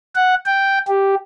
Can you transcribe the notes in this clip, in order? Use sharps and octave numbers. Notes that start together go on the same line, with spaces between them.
F#5
G5
G4